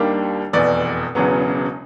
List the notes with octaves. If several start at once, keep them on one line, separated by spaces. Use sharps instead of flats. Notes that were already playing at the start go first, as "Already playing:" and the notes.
Already playing: D#2 D#3 G3 A#3 D4
F1 E2 B2 D5
E1 E2 C#3 F#3 B3